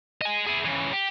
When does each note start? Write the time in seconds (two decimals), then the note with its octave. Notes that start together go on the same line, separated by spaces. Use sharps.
0.21 D#5 G#5
0.47 E4 G#4
0.65 C#3 E3
0.93 G4